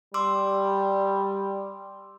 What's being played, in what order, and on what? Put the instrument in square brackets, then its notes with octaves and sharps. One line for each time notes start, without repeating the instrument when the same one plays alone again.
[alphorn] G3 [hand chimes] C6 D6 E6